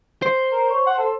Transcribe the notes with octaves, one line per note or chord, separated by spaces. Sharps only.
C5
A#4
C#5
F#5
A4